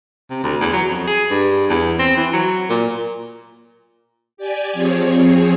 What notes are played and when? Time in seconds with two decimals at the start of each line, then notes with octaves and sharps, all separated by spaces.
0.30 C3
0.43 D2
0.60 E2
0.73 F#3
0.90 F2
1.07 G#4
1.30 G2
1.69 E2
1.99 C4
2.17 E3
2.33 F#3
2.69 A#2
4.37 G4 D5 G#5
4.73 F3 C4 G#4 C#5